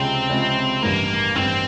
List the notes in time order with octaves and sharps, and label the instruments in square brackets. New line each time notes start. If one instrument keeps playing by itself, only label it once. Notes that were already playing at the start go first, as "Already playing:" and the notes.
Already playing: [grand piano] C#2 C3 F3 G#3 C#4 [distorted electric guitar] C4
[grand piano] C#2 C3 F3 G#3 C#4
[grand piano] A1 G2 D#3 G3 B3 [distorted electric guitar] A#3
[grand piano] A1 G2 D#3 G3 B3 [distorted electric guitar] C4